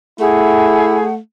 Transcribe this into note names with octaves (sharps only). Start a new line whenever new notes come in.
A3 E4 G#4 F#5